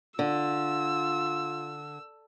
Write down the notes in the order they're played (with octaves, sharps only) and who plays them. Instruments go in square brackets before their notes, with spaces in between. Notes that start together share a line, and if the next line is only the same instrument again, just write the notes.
[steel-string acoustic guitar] D3 [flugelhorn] F4 [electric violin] E6